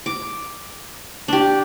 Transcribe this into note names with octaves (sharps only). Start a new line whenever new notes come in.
D6
D4 G4